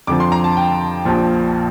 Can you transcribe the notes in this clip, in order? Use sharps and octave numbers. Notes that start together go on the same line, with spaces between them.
F2 D3 F3 D6
C6
A#5
A5
G5
A#1 A#2 F3